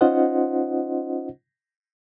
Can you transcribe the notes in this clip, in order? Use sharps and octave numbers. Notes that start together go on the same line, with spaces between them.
C#4 D#4 F4 C5 D#5 F#5